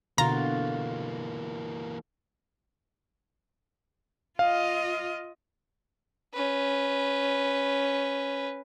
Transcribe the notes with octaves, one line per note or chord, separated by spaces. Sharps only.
B2 D3 E3 A#3 F4 F#4 A#5
F4 D#5 F5
C#4 B4